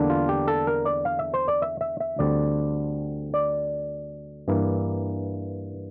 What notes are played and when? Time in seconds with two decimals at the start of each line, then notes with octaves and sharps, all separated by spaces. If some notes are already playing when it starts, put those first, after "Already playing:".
Already playing: E2 D3 G3 A#3 D4
0.10 F4
0.29 G4
0.48 A4
0.67 A#4
0.85 D5
1.05 F5
1.19 E5
1.34 C5
1.48 D5
1.62 E5
1.81 E5
2.00 E5
2.19 D2 D3 G3 C4 D5
3.34 D5
4.48 G2 E3 A#3